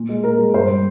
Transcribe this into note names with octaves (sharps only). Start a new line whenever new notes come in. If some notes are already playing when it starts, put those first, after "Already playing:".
Already playing: A#2
G#3
A#2 A#4
G#3
G2 C5
G3